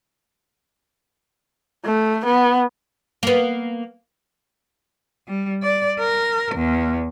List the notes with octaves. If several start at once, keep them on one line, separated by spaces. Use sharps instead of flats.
A3
B3
A#3 B3
G3
D5
A#4
E2